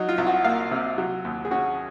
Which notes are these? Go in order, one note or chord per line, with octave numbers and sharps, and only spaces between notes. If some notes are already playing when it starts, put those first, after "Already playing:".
Already playing: F#3 D#4
F4
C2
F#4
A#3 F5
C3
F#3
D#2
G#4
C#4 F#4